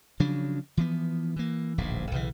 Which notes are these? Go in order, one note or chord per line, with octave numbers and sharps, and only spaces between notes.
C#3 F3 F#3 D4
E3 F3 B3
E3 A#3
D1 A#1 G#2
B1 C#3 E3